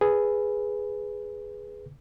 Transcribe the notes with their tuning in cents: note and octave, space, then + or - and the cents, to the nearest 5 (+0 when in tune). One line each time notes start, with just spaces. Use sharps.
G#4 +0 B4 +0